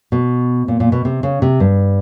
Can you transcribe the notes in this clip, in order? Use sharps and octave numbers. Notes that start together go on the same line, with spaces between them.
B2
A#2
A#2
B2
C3
C#3
C3
G2